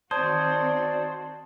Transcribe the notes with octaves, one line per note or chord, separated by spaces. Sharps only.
D#3 C4 F#4 C5 D5 A5 D#6 G#6